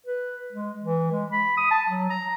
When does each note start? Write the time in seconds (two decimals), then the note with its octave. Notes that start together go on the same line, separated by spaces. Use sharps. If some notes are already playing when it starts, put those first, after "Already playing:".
0.07 B4
0.53 G#3
0.81 E3
1.12 G#3
1.32 B5
1.58 D#6
1.71 A5
1.89 F#3
2.10 A#5